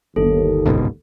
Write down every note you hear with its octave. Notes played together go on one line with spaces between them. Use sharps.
G1 D#2 A4
C#2 G#2 B2